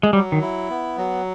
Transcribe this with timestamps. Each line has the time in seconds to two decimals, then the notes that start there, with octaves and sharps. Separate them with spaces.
0.03 G#3
0.13 F#3 G3
0.32 D#3
0.41 E4
0.70 B3
0.97 F#3